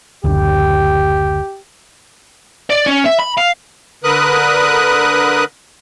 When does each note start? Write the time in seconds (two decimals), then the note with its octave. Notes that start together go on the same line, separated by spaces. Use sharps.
0.24 F#1 D2 G4
2.70 D5
2.87 C#4
3.06 E5
3.20 B5
3.38 F5
4.04 D3 A#4 B4 D#6 F#6